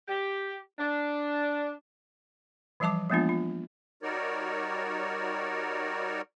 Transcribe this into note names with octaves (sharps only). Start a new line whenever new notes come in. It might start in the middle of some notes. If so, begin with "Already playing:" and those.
G4
D4
E3 F3 G3 E5 A5 D6
F3 G#3 A#3 B3 D4 F4
F4
G3 D#4 F#4 A#4 C#5 D5